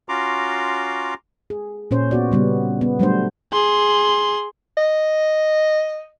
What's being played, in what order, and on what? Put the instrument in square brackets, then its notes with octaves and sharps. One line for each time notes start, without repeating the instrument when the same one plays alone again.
[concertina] C#4 F4 F#4 A#5 C6 D6
[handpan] G#4
A#2 C#4 C5
B3 F#4 D5
C#3 G3 B3
B3
F#3 G3 A3 D4 C5
[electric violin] G#4 C6
[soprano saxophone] D#5